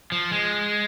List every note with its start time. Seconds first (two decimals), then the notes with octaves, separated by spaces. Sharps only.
0.12 F3
0.32 G#3